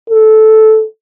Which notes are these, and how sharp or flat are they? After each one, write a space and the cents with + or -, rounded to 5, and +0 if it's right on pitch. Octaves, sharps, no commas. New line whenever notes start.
A4 -10